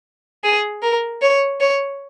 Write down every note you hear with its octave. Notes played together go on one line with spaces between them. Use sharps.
G#4
A#4
C#5
C#5